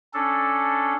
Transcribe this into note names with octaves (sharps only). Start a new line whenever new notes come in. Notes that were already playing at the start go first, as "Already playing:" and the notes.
C#4 D4 A4